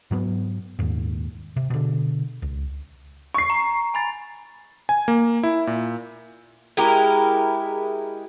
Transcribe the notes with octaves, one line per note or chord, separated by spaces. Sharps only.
G#2 F#3 B3
D#1 D#2 G#2
C3
B2 D3
C#2
C#6 C7
A#5
G#5 B5 A6
G#5
A#3
E4
A#2
G#3 E4 G4 A#4